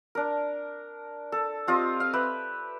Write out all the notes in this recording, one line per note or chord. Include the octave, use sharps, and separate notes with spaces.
D4 A#4
A4
C4 F4 G4 D#5
F5
G4 B4 E5